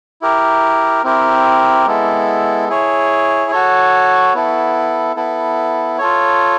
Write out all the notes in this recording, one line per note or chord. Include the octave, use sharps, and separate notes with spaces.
E4 G4 A#4
C4 E4 G4 A#4
G#3 B3 E4 A4
E4 G#4 C#5
F#4 A4 C#5
B3 E4 A4
B3 E4 A4
F4 A4 C#5